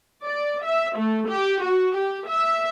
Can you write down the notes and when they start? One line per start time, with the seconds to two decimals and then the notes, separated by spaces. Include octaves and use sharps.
0.24 D5
0.64 E5
0.96 A3
1.29 G4
1.63 F#4
1.96 G4
2.28 E5